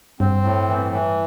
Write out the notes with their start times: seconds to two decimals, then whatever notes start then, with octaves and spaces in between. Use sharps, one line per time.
0.20 G2 C4
0.44 A2
0.68 E3
0.93 E3